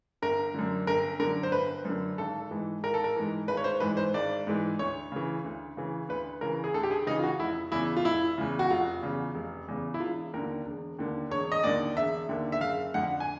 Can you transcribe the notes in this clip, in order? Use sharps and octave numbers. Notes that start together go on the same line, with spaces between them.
G1 A#4
F#2 D3
G1 A#4
F#2 D3 A#4
C5
G1 B4
F#2 D3
G#1 A4
G#2 E3
G#1 A#4
A4
A#4
G#2 E3
G#1 B4
C#5
C5
G#2 E3 B4
C5
G#1 D5
G#2 E3
D2 C#5
C#3 E3
D2
C#3 E3
D2 B4
C#3 E3 A#4
G#4
D2 A4
G4
G#4
C#3 E3 D#4
F4
F#4
F1 E4
E2 C#3 E4
F4
F1 E4
E2 C#3
F#4
F1 F4
E2 C#3
F1
E2 C#3
E4
E1 F4
D#2 D3 A#4
E1
D#2 D3
E1 C#5
D#5
D#2 D3 D5
E1 E5
D#2 D3
E5
F#1 F5
F2 D3 F#5
G#5